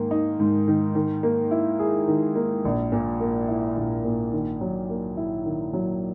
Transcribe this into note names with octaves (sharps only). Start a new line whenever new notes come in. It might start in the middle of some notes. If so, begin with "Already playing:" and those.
Already playing: G#2 D#3 A#3
D#4
G#2
D#3
D#3
A#3
E4
G#4
D#3
A#3
A#1
A#2
A#3
E4
A#1
A#2
D#3
F#3
A#3
E4
D#3
F#3